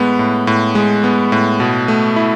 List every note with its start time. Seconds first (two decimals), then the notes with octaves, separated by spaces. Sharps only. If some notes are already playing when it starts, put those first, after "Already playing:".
Already playing: A2 G#3 B3
0.19 A2
0.47 A2
0.75 G#3
1.04 B3
1.32 A2
1.60 B2
1.88 A3
2.16 E4